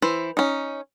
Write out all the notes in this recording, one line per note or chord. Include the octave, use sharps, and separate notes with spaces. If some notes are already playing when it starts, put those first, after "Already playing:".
E3 E4 C5
C#4 D#4